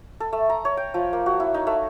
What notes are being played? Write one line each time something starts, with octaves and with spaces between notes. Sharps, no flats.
A4
A3
A#5
C#5
G5
F3
A#3
F#4
E4
D#4
A3